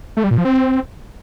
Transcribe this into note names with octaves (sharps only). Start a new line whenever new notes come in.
A3
G3
A#2
F3
C4